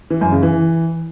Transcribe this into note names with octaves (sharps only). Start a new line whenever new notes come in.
E3
F#2
C#3
E3